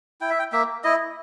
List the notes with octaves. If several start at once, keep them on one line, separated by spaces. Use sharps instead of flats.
E4 G5
E5
G5
A#3 E5
E4 D#5